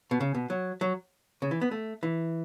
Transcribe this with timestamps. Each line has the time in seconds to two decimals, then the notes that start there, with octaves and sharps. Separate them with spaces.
0.11 B2
0.20 C#3
0.35 B2
0.50 F#3
0.81 F#3
1.42 C#3
1.51 E3
1.61 B3
1.71 A3
2.03 E3